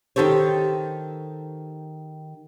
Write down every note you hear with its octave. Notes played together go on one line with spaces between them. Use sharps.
D#3 G4 A4 C5 C#5